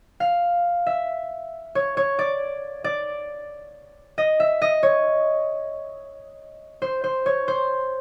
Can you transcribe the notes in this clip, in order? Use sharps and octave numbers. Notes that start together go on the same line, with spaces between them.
F5
E5
C#5
C#5
D5
D5
D#5
E5
D#5
C#5
C5
C5
C#5
C5